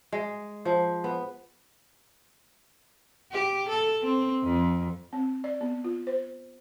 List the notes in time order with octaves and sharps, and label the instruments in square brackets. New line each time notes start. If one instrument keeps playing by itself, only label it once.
[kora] G#3
F3
B3
[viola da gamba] G4
A4
C4
F2
[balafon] C4
D5
B3
F4
C5